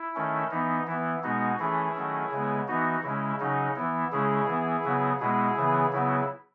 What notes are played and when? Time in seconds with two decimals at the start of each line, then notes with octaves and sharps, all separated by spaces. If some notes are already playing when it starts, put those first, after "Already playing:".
Already playing: E4
0.15 D#3 A3 C#4
0.51 E3 B3 D#4
0.87 E3 B3 E4
1.23 B2 G#3 B3 D#4 F#4
1.59 E3 A3 C#4 E4 G#4
1.95 D#3 F#3 A3 C#4
2.31 C#3 G#3 B3
2.68 E3 B3 D#4 F#4
3.04 C#3 G#3 C#4 E4
3.40 C#3 F#3 C#4 D#4
3.76 E3 B3 E4
4.12 C#3 G#3 C#4 E4 G#4
4.48 E3 B3
4.84 C#3 F#3 B3
5.20 B2 G#3 B3 E4 G#4
5.56 C#3 E3 B3
5.92 C#3 F#3 B3 E4